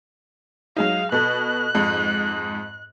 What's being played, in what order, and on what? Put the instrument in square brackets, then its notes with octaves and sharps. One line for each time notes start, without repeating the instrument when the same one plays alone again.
[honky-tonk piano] F#3 G#3 D#4 [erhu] F5
[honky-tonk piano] B2 A4 [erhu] F#6
[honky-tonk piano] F2 G#2